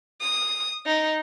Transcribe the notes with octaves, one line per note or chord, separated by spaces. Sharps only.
D#6
D#4